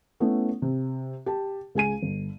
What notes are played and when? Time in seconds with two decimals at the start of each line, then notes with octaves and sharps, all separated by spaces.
0.20 A3 B3 C#4 E4
0.62 C3
1.26 G4 A5
1.75 C#2 G#4 G#5 D#7
2.02 G1